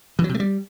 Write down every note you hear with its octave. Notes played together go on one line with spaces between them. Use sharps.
E3
F#3
C3
A3
G3